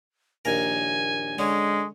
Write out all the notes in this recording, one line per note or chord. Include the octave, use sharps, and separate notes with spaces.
A#1 D#2 A#4 G#5
D3 G#3 C#4